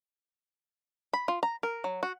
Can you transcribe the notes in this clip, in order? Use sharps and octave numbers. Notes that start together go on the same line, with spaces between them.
B5
F4
A#5
A#4
F#3
F#4